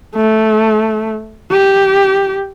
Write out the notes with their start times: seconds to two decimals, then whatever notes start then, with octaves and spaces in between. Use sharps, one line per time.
0.16 A3
1.51 G4